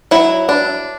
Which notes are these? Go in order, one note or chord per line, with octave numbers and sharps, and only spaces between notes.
F#3 E4
D4